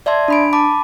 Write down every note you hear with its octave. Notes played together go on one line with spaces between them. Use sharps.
D5 E5 A5 C6 G#6
D4 B5 D7
A5 B5 D6